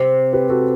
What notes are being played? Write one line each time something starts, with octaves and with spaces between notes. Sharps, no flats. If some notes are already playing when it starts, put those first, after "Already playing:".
Already playing: C3
G4 B4
F#4 A4